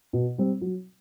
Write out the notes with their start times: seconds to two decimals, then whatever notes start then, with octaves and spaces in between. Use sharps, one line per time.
0.13 B2
0.38 G3 C4
0.61 F#3